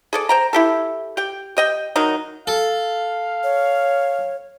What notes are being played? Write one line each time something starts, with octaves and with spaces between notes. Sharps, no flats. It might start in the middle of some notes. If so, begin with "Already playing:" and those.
G#4 A4 D5
C5 G5 A#5
E4 G4 A4
G4 G5
G4 D#5 G5
D#3 F#3 D#4
A4 F5
C#5